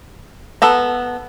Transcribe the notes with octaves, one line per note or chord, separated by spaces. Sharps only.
B3 A4 A#5